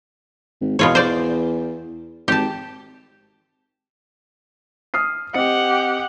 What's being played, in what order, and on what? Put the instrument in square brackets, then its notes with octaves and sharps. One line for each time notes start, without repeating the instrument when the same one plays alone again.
[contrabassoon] G#1
[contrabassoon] E2 [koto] B2 F4 C#5
[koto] C5 D5
[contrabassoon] G#1 [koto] G4 A5
[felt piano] D#6 F6 C7
[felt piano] C4 D#5 C#7 [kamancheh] G4 F#5